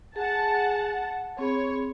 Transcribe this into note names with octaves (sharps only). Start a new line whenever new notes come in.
G#4 F#5 G#5 A5
C4 G#4 C#5 B5